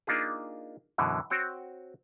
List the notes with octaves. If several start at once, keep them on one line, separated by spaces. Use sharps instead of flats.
A#3 D4 D#4 F4 G#4
F#2 B2 D3 E3
C4 F#4 C#5 G5